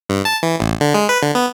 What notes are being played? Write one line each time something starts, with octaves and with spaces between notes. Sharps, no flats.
G2
A5
E3
A1
D3
G#3
B4
D3
B3